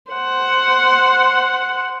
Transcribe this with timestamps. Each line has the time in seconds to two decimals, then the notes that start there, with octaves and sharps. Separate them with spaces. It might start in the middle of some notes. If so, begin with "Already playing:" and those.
0.12 C5 F#5